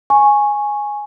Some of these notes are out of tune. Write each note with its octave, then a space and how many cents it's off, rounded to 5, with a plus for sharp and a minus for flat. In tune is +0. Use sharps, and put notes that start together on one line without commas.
G#5 +0 C#6 -10